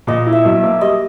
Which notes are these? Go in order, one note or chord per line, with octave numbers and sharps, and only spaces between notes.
A#2 D#5
E4
E5
B1
A#3
G3 D#5